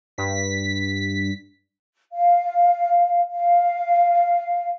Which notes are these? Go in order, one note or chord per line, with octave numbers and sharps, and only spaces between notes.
G2 B6
F5
F5